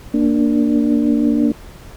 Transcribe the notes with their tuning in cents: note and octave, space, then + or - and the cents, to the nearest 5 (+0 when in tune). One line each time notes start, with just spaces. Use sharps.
A#3 +0 D4 +0